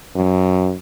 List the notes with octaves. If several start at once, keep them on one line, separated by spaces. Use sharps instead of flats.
F#2